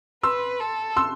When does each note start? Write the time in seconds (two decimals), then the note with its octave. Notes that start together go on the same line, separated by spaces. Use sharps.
0.23 B4 C6 E6
0.60 A4
0.96 C6 E6